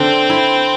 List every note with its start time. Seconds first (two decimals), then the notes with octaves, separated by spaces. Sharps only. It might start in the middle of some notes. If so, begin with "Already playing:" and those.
Already playing: D3 C4
0.30 E4